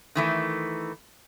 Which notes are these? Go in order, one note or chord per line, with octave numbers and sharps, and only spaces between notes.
D#3 E3 A3